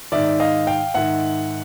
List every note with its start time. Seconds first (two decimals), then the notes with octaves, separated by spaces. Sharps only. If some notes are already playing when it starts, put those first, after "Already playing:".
0.12 G#2 D#3 D5 E5
0.40 D#5 F5
0.67 F5 G5
0.94 G#2 D#3 E5 F#5